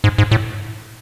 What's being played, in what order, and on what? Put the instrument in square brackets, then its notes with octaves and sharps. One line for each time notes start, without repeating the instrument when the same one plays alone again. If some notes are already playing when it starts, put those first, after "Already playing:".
[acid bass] G#2
G#2
A2